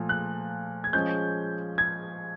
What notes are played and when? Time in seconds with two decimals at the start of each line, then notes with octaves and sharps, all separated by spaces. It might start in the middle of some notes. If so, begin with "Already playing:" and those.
Already playing: A#2 F3 A3
0.09 F#6
0.84 G#6
0.93 F3 G#3 C#4 G6
1.78 G#6